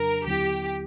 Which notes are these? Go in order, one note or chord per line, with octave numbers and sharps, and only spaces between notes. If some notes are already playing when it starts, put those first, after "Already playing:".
Already playing: F2 C#3 F#3 D4 A#4
D#2 D3 F#3 B3 E4 G4